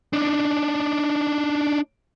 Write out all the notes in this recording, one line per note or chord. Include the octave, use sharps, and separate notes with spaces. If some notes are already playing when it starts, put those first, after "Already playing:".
D4 D#4